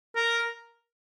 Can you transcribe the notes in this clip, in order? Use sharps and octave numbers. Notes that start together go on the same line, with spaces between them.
A#4